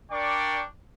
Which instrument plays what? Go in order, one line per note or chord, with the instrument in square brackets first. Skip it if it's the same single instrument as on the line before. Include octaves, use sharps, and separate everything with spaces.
[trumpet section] D4 A#4 D5 G5 C#6